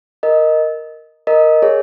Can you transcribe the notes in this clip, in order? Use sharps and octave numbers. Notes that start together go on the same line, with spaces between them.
A#4 D#5
A#4 D#5
G#4 C#5